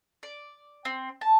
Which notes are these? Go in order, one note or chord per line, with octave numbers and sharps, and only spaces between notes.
D5
C4
A5